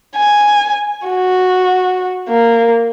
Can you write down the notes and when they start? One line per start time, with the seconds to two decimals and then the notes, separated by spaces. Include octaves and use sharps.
0.16 G#5
1.07 F#4
2.29 A#3